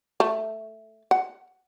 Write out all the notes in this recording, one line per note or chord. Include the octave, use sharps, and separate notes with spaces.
A3
F#5